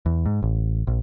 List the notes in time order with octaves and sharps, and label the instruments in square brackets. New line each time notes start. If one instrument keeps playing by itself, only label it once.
[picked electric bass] E2
G#2
A1
A#1